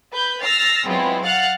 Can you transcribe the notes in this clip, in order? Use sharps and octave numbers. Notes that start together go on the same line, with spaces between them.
B4 B5 G6
E6 F6 A6 A#6 C7
F#3 G#3 B3 C4 E4 F4
F5 F#5 F6 F#6 A6